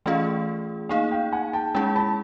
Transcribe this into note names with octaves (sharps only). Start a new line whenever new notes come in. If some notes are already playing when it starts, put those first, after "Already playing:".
E3 A3 C#4 F4 G#4 D#5 F5
A#3 D#4 G#4 D#5 F5
F5 G5
F#5 G#5
G5 A5
G#3 C#4 E4 G#4 G5 A5
A5 B5